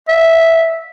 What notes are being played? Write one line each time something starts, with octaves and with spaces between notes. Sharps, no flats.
E5